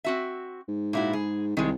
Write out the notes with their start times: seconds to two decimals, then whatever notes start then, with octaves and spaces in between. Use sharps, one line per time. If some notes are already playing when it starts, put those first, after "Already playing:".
0.04 C4 F#4 E5
0.68 G#2
0.93 A#2 E4 F#4
1.13 G#4
1.57 C2 D#3 G#3